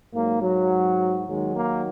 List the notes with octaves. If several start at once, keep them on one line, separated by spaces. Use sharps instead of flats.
G#2 F#3 A#3
F#3
D#2 D#3 F#3 G#3
A#3